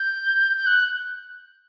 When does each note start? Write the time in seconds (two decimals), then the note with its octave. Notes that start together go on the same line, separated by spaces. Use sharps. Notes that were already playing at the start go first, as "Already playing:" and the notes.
Already playing: G6
0.57 G6
0.66 F#6